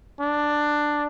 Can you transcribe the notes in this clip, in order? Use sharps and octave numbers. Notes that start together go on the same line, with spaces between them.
D4